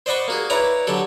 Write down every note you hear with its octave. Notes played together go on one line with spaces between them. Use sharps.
C5 D5 D#5 F#5 B5 C#6
A#3 F#4 G#4
E4 B4 C#5 D5 A#5
D3 F#3 G4 A4